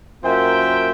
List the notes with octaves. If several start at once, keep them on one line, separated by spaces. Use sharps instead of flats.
F#2 A#3 F4 C5 E5 G5